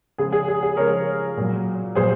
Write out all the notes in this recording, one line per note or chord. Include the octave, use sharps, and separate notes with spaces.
C#3 F3 G#3 G#4
G#4
G#4
G#4
C#3 F3 G#3 A#4 C#5
A#2 F#3
A#2 F#3 G#4 C5